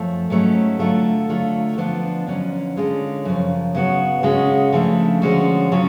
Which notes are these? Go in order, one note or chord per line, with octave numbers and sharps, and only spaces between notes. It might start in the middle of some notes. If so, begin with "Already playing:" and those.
Already playing: F#2 F3 A3
G#2 F#3 A3 C#4
D3 F#3 A3 F4
D3 F#3 A3 F4
D3 F3 B3 D4 F4
F2 D3 F#3 C#4
D3 G#3 C#4 F4
F#2 C#3 F3
C#3 F#3 B3 F#4
C#3 G#3 C#4 F#4
C#3 F3 A3 D4
D3 F3 G#3 C#4 F#4
C#3 F#3 C#4 F4